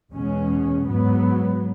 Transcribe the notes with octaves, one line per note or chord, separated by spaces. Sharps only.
E2 B2 G#3 C#4
G#2 F#3 B3